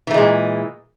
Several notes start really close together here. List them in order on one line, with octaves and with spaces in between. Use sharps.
E3 A3 G#3 A#2